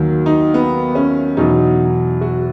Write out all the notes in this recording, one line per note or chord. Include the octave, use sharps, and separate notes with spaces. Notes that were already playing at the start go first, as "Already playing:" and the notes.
Already playing: D#2 D#3 F#3
D#4
B3
C#4
E2 B2 F#3 D#4
F#4